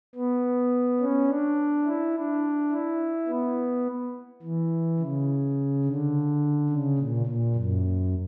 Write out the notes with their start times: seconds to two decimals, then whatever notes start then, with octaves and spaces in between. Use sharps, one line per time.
0.15 B3
1.00 C#4
1.29 D4
1.86 E4
2.14 D4
2.71 E4
3.28 B3
4.43 E3
4.99 C#3
5.85 D3
6.69 C#3
6.98 A#2
7.26 A#2
7.55 F#2